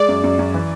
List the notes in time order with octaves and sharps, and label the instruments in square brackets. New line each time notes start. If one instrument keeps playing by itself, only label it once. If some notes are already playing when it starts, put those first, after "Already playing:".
Already playing: [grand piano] G#3 [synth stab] D5
[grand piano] F#2
F#2
F#2
E3